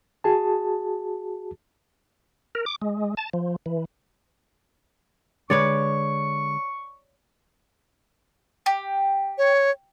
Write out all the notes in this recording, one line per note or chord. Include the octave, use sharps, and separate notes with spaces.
F#4 G#4 A5
A#4
D6
G#3
A5
F3
E3
D3 G#3 B4 C#5 D5 C#6
G4
C#5